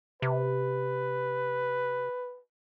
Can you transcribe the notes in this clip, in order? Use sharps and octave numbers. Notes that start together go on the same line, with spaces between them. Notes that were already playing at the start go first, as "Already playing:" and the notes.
C3 B4